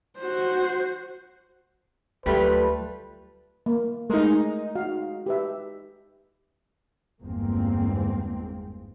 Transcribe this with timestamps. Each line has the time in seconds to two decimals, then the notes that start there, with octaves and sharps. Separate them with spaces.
0.20 F#4 C5
2.26 D2 F#3 G3 A3 F4 B4
3.66 A#3
4.10 G#3 A3 D#4 A#4
4.75 F#4 F5
5.26 G4 B4 E5
7.20 G1 E2 G#2 G#3 A#3 C4